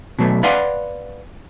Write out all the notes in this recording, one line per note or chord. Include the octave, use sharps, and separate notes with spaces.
B2 F#3 A3
B4 D5 F5 F#5 G#5 C6